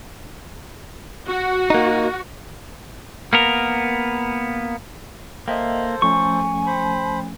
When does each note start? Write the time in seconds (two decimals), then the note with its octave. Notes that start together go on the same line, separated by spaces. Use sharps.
1.29 F#4
1.70 A#3 D#4
3.33 A#3 B3 A#4
5.48 A#3 A4 C5 D#5 E5 G5
6.02 F3 A3 C#4 G#5 C#6
6.66 C5 B5